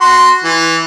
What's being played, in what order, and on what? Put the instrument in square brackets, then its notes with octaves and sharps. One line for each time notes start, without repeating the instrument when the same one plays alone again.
[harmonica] F#4 C6
E3